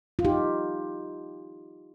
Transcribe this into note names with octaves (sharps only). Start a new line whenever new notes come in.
F4
D#4 G4